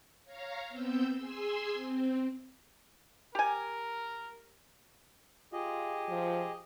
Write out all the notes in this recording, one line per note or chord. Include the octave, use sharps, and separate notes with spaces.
C#5 F5 A#5
B3 C4 E6 G6
G#4 G#5 C6 E6
C4
G4 A#4 G#5
F4 G4 G#4 D#5
F3